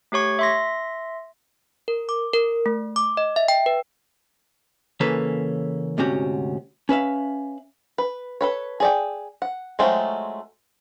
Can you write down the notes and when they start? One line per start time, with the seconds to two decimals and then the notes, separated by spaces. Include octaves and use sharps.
0.12 A3 G4 C#5 C#6 G#6
0.39 E5 C6 A#6
1.88 A#4
2.09 D6
2.33 A#4
2.66 A3
2.96 D6
3.17 D#5
3.36 E5
3.48 G5
3.66 B4
5.00 C#3 E3 A#3 C#4 A4 B4
5.98 D2 G#2 C3 C#4 F#4 G4
6.89 C#4 B4 E5 F5
7.98 B4
8.41 A4 B4 C#5
8.80 G#4 D5 G5
9.42 F#5
9.79 F#3 G#3 A3 C4 F4